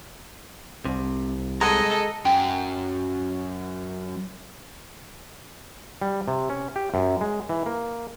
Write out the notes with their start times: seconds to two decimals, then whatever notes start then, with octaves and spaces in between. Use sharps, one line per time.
0.85 C2 C3
1.61 G#3 G#4 A4 D#5 F#5 A#5
2.25 F#2 G5
6.01 G3
6.28 C3
6.50 C#4
6.76 G4
6.94 F#2
7.21 G#3
7.49 E3
7.66 A#3